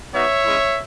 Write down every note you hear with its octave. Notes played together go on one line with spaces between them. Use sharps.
B3 D#4 F#4 C#5 E5
G#3 C#4 E4